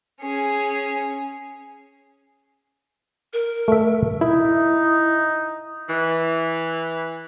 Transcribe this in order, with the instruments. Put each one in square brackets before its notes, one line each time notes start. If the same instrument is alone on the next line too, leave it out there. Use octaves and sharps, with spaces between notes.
[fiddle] C#4 G#4
[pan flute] A#4
[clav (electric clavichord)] A3 E5
[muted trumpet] D#4 [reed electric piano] E4
[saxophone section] E3